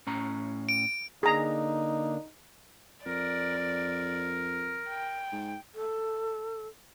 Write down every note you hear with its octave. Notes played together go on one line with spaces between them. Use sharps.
A2 C#4 A#5
D7
D3 A#3 D4 D#4 G#4 A#5
F2 A#4 D5
A#4
G5
G#2
A4